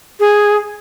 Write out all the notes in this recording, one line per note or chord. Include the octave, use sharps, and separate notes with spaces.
G#4